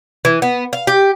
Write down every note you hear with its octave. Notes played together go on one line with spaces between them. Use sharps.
E3
B3
F5
G4